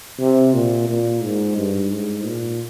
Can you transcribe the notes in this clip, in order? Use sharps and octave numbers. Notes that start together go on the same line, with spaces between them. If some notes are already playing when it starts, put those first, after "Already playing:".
C3
A#2
A#2
G#2
G2
G#2
A#2